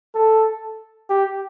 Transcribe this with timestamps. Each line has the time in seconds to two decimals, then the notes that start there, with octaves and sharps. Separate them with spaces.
0.15 A4
1.10 G4